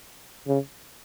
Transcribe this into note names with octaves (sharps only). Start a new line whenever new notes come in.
C#3